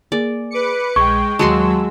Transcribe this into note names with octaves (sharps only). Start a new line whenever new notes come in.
A#3 G#4 D5
B4 D6 C#7
A#1 G#3 G5 C#6 G#6
D#2 F#3 G#3 F#4 A5 C6 E6